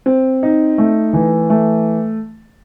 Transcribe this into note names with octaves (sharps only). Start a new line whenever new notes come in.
C4
D#4
A3
E3
A3